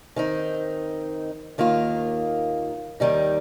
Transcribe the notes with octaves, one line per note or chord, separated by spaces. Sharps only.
D#3 C4 D#4
D#2 D#3 A#3 F4
D#2 D#3 G3 D#4